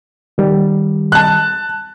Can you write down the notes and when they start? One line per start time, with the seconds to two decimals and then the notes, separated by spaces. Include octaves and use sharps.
0.38 D#3 G3
1.12 A5 F#6